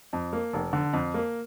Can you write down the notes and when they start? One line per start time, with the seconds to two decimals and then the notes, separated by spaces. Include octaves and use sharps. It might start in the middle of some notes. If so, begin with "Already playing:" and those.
0.13 F2
0.33 A#3
0.53 F1
0.73 D3
0.93 F2
1.14 A#3